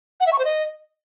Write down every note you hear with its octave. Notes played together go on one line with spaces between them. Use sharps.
F#5
E5
C#6
C5
D#5